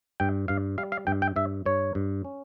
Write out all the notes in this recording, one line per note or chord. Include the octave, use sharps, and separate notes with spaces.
G2 G5
G2 F5
G3 F5
F5
G2 G5
G5
G2 E5
G2 C#5
G2
C#4